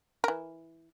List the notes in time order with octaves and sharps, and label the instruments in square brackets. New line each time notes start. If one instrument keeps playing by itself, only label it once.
[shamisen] E3 A#4